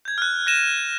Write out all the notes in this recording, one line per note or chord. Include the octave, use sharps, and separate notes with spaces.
G6 G#6
F6 F#6
F#6 A#6 D#7 E7